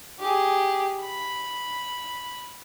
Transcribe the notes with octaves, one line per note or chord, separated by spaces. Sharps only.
G4 G#4
B5